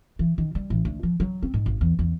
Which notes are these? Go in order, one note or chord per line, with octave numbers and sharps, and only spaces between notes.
E3
D#3
G3
A1
D2
F3
F#3
C4
G#2
G#1
E2
E2